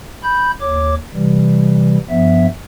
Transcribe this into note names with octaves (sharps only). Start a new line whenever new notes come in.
B5 G6
D#2 C#5 D6
C3 E3 G3
G2 F3 B3 E5